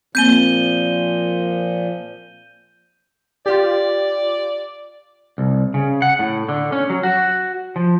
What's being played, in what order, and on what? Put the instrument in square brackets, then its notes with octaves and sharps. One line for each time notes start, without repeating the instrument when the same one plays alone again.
[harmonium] A#2 F3 [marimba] A#3 C4 [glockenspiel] G6 D#7 G7
[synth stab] F4 G4 [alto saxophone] D5
[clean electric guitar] C2
C#3
F#5
A2
D3
C#4
F#3
F#4
F3